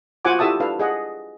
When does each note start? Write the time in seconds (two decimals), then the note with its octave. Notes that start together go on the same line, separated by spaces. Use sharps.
0.25 F4 F#4 C5 F#5 G#5 D6
0.39 E4 G4 A4 E5 A5 D#6
0.60 D4 A4 B4 F5
0.79 G#4 D#5 F#5